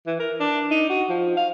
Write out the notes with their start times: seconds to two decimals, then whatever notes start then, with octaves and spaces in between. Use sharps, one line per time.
0.07 E3
0.19 A#4
0.40 D4
0.71 D#4
0.90 F#4
1.09 F3
1.37 F5